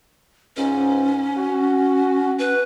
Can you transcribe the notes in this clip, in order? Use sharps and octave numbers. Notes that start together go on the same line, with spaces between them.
C#2 G#2 C#4
F#4
B4